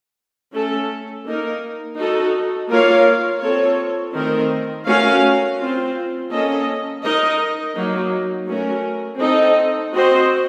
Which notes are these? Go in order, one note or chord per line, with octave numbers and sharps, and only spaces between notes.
A3 C#4 A4
A#3 D#4 A#4
D#4 F#4 A4
A#3 F4 A#4 C#5 F5
C4 F4 A4 C#5
D#3 A3 C4 D#4 A#4
A3 C#4 F#4 A#4 F5
C4 F4 C5
A#3 C#4 A4 D#5
D#4 A#4 D#5
F#3 A#3 D#4
A3 C#4 F#4 A#4
C4 D#4 A4 D#5
C4 F#4 C5 D#5